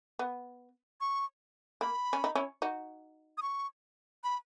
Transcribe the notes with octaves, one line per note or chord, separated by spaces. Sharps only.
B3
C#6
A#3 B5
C#4
D#4
C#4 E4
D#4 F#4
D#6
C#6
B5